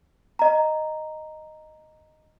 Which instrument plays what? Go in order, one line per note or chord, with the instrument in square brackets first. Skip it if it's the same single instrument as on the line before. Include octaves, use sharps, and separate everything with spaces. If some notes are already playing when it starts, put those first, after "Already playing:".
[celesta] D#5 A#5